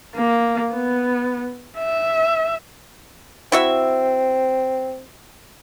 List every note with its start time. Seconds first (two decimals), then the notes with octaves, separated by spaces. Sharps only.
0.16 A#3
0.72 B3
1.78 E5
3.52 C4 E4 F#4 E5